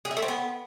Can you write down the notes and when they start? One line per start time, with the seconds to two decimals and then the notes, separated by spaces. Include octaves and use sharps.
0.05 G#4
0.11 E4
0.17 A3
0.22 C4
0.28 B3